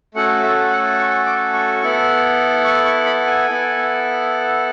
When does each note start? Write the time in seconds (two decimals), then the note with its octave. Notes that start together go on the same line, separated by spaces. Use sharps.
0.14 A3 C#4 F#4 A4 F#5
0.43 E5
0.70 F#5
0.99 C#6
1.26 D6
1.53 C#6
1.82 B3 E4 A4
2.65 C#6
2.85 C#6
3.06 B5
3.27 G#5
3.48 B3 E4 A4